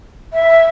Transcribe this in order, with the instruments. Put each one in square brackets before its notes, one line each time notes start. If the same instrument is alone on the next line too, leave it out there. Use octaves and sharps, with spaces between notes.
[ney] E5